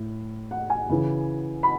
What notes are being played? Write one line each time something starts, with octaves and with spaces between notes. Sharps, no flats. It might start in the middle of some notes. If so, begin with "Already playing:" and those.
Already playing: A2
F#5
G#5
C#3 E3
B5